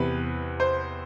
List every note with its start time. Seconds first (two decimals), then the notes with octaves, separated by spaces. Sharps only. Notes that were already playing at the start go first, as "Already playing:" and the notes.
Already playing: E2 C3 E3 B4
0.60 C5